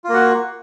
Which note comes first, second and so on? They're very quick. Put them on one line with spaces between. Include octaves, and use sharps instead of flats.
F4 A#3 F#4